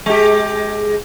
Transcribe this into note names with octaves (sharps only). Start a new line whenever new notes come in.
G#3 G4